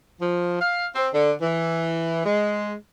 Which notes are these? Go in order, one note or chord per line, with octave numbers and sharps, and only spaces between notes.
F3
F5
C4
D3
E3
G#3